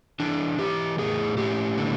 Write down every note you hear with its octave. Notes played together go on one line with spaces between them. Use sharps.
E3 D4
E3 G4
A2 G#4
A2 G4
D3